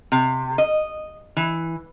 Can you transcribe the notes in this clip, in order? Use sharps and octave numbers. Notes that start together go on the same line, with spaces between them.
C3
D#5
E3